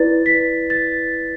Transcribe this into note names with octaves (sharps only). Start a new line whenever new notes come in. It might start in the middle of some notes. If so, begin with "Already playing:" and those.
Already playing: E4 B4 D5 A6
B6
A6